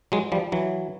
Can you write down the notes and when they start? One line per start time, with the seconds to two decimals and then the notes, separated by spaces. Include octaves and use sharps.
0.12 F#3 G#3
0.32 F3 G3
0.52 E3 F#3